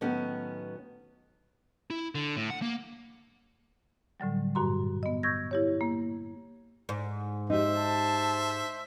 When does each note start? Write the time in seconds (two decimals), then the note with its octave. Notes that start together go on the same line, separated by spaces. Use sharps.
0.01 A2 D#3 F#3 B3 C#4
1.90 E4
2.15 D3
2.37 A2
2.50 F#5
2.62 A#3
4.20 A2 D3 F#3 G3
4.55 G2 A#2 F#4 A#5 C6
5.03 B3 D#5
5.23 C#6 E6 G6 G#6 A#6
5.51 E4 G4 C#5
5.81 A#3
6.89 G#2
7.50 D#4 G4 C5 E5
7.79 A5